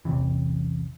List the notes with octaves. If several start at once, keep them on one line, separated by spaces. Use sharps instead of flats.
A1 E2 C3 E3